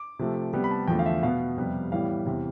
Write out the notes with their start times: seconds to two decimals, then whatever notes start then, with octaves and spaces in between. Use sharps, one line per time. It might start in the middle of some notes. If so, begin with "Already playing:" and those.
Already playing: D6
0.19 C3 F3 A3
0.53 C3 G3 B3
0.64 B5
0.71 A5
0.87 E2 D3 F3 A3 G5
0.99 F5
1.06 E5
1.23 B2 B3 F5
1.57 F2 C3 G3 B3
1.91 A2 E3 G3 B3 F5
2.26 E2 C3 E3